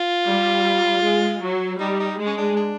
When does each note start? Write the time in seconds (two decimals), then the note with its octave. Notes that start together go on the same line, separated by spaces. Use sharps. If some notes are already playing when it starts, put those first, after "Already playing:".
Already playing: F4
0.27 G3
1.03 G#3
1.42 F#3
1.80 G3 D#4
2.00 D#4
2.19 G#3
2.26 C#4
2.38 D4
2.57 D4